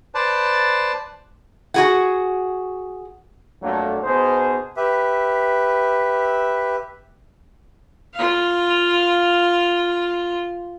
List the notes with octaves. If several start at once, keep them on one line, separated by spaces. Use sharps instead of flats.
B4 C5 D5 A5
F#4 G#4 F#5
F2 F#3 A3 A#3 D4
B2 D#4 G#4 C5
G4 B4 E5
F4 F5